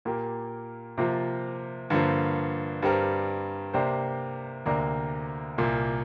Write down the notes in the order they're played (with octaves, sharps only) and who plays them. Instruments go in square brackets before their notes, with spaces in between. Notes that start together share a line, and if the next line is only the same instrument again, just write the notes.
[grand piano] A#2 A#3 G4 A#4
C3 F3 A#3 F4
G2 D3 F3 A#3
G2 G3 C4 G4 A#4
C3 A#3 D4 G4 C5
D2 C3 A#3 D4 A#4
C2 A#2 A#3